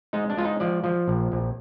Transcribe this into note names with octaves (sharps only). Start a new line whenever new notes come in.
G#3 D#4
D4
G#3 F4
D#4
F3 D5
F3
A#1
A#1